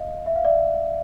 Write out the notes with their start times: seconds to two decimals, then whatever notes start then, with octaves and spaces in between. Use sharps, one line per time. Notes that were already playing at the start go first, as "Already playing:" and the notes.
Already playing: D#5 F5
0.26 E5
0.36 F5
0.45 D5 E5